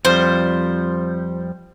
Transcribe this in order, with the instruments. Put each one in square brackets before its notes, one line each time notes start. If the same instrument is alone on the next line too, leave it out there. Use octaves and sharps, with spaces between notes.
[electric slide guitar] F2 F3 G3 [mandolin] C5